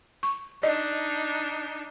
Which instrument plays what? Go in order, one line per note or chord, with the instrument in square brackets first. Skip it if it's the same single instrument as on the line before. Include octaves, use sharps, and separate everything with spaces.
[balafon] C#6
[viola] D4 D#4 [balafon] D5 D#5